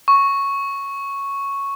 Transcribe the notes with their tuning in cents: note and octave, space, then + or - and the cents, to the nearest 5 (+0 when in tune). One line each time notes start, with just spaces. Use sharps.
C#6 +0